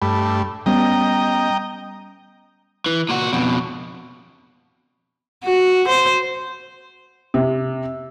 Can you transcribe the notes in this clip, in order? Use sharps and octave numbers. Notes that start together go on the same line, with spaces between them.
G2 A3 B5
G3 B3 C#4 D#5 G5 A#5
E3
A#2 F#4
F2 B2
F#4
C5
C3